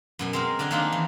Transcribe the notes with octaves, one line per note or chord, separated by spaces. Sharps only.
F#2 B2 G#5
G#3 C4 A#4
D3 D5 G#5 C6
D#3 G#3 A#3 C4 D4 D#4
E3